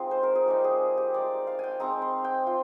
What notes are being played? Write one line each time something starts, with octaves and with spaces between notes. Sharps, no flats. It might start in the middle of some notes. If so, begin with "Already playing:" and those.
Already playing: G#3 C4 D#4 F4
C5
A#4
G#4
G3 C4 D#4 G4
G#4
G4
G#3 D#4 D5
F5
G5 G#5
G#3 C4 D#4 A#5
C6
G5
F4